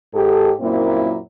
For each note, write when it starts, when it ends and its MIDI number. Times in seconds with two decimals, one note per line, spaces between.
0.14 0.51 44
0.14 0.51 67
0.14 0.51 69
0.60 1.17 42
0.60 1.17 46
0.60 1.17 54
0.60 1.17 58
0.60 1.17 60
0.60 1.17 64